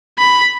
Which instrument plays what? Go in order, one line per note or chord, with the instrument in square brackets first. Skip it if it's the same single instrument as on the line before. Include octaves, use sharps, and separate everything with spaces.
[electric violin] B5